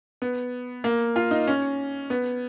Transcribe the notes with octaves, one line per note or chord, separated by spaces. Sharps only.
B3
A#3
F4
D#4
C#4
B3